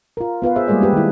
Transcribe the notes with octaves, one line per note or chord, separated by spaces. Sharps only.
F4 A#4
B3 F4 B4 F5
G#4 C5 E5
G3 G#3 A#3 G#4 D5
G#3 D4 G4 B4
D#3 E4